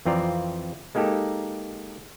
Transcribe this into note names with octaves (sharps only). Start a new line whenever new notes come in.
F2 E3 C4 F4 D5 A#5
G#3 A#3 D#4 G4 A4